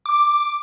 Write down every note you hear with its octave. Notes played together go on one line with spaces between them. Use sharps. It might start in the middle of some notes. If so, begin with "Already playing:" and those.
D6